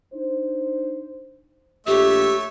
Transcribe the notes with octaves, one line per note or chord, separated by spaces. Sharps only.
D4 D#4 C5
A#1 A3 G4 C#5 E5